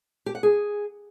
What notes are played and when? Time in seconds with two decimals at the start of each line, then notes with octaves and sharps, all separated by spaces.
0.26 G4
0.35 F#5
0.43 G#4